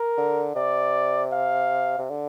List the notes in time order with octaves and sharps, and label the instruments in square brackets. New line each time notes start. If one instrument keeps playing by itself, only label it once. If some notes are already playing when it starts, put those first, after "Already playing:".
Already playing: [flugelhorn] A#4
[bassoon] D3
[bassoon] C3 [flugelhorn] D5
[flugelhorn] F5
[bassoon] C3
D3